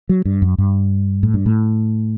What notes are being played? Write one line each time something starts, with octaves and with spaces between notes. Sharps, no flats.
F#3
G2
F#2
G2
A2
G2
A2